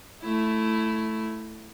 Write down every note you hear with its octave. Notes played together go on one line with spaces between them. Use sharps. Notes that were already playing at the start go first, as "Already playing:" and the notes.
A3 E4